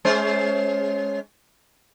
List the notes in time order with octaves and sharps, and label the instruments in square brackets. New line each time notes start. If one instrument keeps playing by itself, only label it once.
[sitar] G#3 C#4 C5